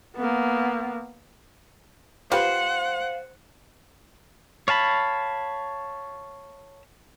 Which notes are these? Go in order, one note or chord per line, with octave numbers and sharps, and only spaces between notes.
A#3 B3
F4 G4 B4 C5 F5 F#5
C#5 F5 A5 B5